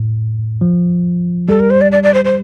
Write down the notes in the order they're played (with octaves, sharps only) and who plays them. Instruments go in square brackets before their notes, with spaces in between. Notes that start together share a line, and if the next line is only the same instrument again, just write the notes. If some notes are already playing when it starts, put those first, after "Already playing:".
Already playing: [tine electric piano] A2
F3
[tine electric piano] G3 [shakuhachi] A4
[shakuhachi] A#4
C5
D5
D5
D5
C5
C5